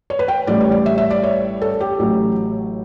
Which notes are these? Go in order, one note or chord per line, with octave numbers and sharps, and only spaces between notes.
C#5
B4
G5
A1 A2 G3 D5
C#5
D5
E5
E5
D5
C#5
A4
G4
A1 A2 F#3